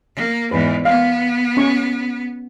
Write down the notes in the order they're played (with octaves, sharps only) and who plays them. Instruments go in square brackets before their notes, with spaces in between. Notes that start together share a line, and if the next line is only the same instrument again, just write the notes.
[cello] A#3
[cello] E2 G#2 [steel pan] B4
[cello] B3 [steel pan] F5
[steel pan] C#4 C#6